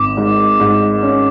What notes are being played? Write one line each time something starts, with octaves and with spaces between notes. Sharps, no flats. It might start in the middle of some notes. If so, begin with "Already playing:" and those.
Already playing: G#1 D6
G#2
G#2
C#4